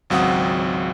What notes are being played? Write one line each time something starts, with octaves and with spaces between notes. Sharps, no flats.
G#1 C#2 F#3 C4 F#5 D#6